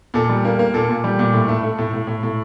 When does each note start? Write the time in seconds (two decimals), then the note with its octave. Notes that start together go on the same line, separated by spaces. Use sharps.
0.14 A#2 A4
0.29 G3
0.45 A#3
0.59 A#3
0.74 A#2 A4
0.89 A#2
1.04 G3
1.19 A#2
1.33 A2
1.48 A3
1.63 A3
1.79 A2
1.93 A2
2.07 A2
2.23 A2